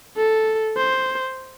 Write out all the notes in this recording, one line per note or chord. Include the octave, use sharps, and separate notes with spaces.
A4
C5